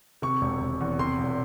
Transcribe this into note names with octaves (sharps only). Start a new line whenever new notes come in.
C3 C#6
E1
E1
E2
C3 C6
E1